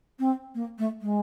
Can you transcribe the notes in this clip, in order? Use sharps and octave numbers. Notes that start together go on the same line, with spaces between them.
C4
A#3
A3
G#3